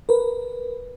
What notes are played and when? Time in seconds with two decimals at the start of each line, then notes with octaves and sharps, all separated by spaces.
0.09 A#4 B4